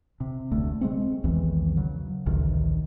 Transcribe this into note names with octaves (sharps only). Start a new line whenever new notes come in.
C3
F1 D2 A3
G#3 A3 C4
B1 E2 D#3 E3
C#3 F#3
A1 D2 C3 D#3